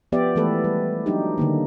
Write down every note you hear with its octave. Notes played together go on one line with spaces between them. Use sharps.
F3 B3 G4 D5 E5
E3 G#3 A3 B3 A4 B4
G3
F#3 D4 D#4 G4
D3 D#3 A#3